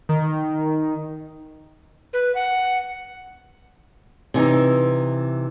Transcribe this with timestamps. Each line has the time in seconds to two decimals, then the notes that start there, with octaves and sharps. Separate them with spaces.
0.09 D#3
2.13 B4
2.35 F#5
4.34 C3 E3 D#4